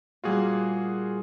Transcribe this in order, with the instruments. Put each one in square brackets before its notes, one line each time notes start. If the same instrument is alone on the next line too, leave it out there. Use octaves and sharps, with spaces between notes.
[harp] A#2 G3 A#3 [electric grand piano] F4 F#4 G#4